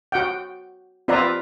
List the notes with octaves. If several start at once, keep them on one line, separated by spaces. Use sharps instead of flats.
F#4 F#5 G5
C4 F4 B4 D5 E5 A#5